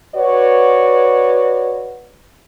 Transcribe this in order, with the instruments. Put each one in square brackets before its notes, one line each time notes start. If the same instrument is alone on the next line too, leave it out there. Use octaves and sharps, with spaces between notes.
[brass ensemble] F#4 B4 C#5 D5